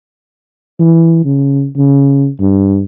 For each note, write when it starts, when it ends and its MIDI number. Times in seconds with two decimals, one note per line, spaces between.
0.80 1.20 52
1.25 1.67 49
1.77 2.29 49
2.40 2.84 43